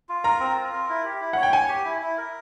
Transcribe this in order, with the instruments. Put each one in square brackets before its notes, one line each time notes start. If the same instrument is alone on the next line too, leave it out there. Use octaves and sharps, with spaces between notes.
[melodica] F4
[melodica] A#4 [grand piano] A#5
[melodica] C4
F4
A#4
E4
G4
E4
[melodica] C#5 [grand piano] F#5
[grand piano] G5
[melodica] C#5 [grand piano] G#5
[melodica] G4
E4
E4
A#4